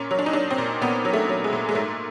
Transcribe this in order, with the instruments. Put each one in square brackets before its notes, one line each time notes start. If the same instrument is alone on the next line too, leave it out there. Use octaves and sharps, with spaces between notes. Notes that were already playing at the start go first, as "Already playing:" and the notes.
Already playing: [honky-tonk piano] A#2 C#4
F#3
D4
D#4
F#3 D4
C4
A#2
A#2 B3
F#3
A3
F#3
G#3
A#2
G#3
G#2 A3